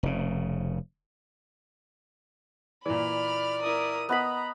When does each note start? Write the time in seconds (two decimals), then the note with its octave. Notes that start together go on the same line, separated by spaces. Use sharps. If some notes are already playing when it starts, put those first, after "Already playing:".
0.03 F1 C#3
2.86 A#2 E3 D5 B5 F6
3.62 E4 A#4 D#6
4.09 B3 D#5 A#5 B5